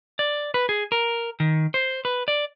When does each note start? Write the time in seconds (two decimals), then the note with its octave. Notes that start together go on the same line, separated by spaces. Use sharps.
0.19 D5
0.54 B4
0.69 G#4
0.92 A#4
1.40 D#3
1.74 C5
2.05 B4
2.28 D5